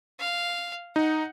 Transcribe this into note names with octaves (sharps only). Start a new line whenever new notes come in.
F5
D#4 F#5